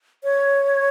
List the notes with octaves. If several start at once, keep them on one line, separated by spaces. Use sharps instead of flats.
C#5